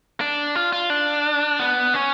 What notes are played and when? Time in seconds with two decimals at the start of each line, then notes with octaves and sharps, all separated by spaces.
0.21 D4
0.55 F4
0.73 F4
0.90 D4
1.59 B3
1.94 C#4